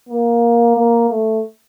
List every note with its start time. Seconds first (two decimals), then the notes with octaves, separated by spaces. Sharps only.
0.09 A#3
0.76 A#3
1.10 A3